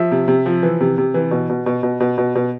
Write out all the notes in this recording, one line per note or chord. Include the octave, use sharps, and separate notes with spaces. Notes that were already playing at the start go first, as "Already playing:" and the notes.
Already playing: F3 E5
C3
C3
F3
E3
C3
C3
E3
B2
B2
B2
B2
B2
B2
B2